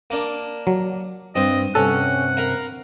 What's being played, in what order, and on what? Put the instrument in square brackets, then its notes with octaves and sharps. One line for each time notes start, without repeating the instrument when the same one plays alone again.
[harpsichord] A#3 D4
[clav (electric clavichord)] F#3
[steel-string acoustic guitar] G2 [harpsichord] C4 [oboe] D#5
[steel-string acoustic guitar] G2 C3 C4 [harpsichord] C#4 [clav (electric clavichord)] A4 [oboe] F#5
[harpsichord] A#4 F5 B5